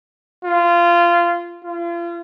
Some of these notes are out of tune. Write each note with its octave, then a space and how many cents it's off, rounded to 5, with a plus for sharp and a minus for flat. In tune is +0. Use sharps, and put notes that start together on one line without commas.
F4 -20
F4 -35